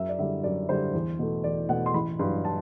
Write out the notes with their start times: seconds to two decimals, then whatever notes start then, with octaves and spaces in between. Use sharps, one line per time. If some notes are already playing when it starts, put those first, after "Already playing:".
Already playing: F#2 E5
0.09 D5
0.19 D3 G3 E5
0.44 F#2 D5
0.69 D3 G3 C5
0.94 E2
1.19 B2 A3
1.44 E2 D5
1.69 B2 A3 F#5
1.86 C6
1.94 A1 B5
2.19 G2 F#3 C6
2.45 A5